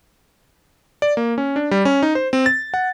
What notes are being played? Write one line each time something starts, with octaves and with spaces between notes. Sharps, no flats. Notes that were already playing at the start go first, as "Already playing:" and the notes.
D5
A#3
C#4
D4
G3
C#4
D#4
C5
C4
A6
F#5